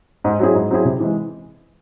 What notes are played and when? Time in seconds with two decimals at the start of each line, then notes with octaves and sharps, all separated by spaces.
0.24 G#2
0.39 F#3 C4 E4 G#4
0.55 G#2
0.70 F#3 C4 E4 G#4
0.85 C3
1.00 E3 G#3